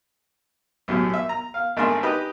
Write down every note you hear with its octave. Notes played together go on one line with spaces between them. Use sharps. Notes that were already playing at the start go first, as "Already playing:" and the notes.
B1 F#2 A2 G3
E5
A#5
F5
G#1 A3 D4 G#4 A#4 C6
D#4 G4 B4 D#5 B5